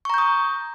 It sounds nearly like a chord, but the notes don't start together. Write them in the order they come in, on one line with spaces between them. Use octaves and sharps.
C#6 A#5 G6 D#6